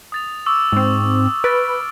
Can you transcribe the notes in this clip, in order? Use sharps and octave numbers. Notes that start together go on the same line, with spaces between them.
D#6 A6 F7
C#6 D6 E6
G#2 C4
B4 F6 A6 D7